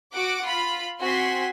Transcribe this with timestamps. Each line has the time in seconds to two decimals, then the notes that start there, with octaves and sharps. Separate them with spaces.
0.12 F#4 F#5 D6
0.44 F4 B5
1.01 C4 F#4 G#5 C6 B6